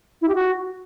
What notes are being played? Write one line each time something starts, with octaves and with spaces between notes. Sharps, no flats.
E4
G4
F#4